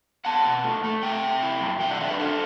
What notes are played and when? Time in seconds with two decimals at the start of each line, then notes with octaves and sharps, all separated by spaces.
0.25 B3 F#5 A5
0.45 B2
0.64 A3
0.84 A3
1.03 C3 E5 G5
1.23 C3
1.43 E4
1.61 F#2
1.80 B2 E5 G5
1.91 D5 F#5
2.00 D4 C5 E5
2.10 B4 D5
2.19 A3 A4 C5